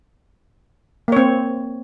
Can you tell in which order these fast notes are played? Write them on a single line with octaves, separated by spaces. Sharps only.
A#3 C#5 C4